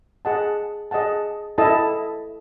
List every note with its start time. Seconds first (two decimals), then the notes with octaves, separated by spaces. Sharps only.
0.25 G#4 D#5 F#5 A5
0.91 G#4 D#5 F#5 A5
1.58 E4 A4 D#5 A5